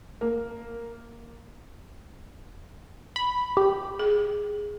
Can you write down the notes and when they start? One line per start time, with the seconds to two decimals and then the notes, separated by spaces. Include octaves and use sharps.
0.21 A#3
3.16 B5
3.57 G4
3.99 G#4